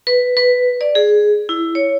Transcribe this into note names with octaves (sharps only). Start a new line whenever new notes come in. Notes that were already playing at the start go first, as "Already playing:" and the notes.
B4
B4
D5
G#4
E4
C#5